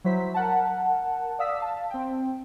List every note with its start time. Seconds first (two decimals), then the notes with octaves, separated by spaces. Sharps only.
0.04 F#3 E4 C5 B6
0.34 A#4 F#5 A5
1.39 D5 F5 D#6 E6 B6
1.59 F5 A5
1.90 C4 G5